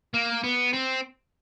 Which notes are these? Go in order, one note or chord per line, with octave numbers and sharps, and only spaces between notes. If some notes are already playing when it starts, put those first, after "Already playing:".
A#3
B3
C4